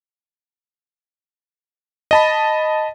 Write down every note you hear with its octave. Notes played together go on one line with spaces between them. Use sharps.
D#5 A5 B5